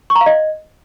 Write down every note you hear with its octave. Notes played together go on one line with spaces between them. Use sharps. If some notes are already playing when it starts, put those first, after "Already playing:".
C#6
A#5
F5
D#5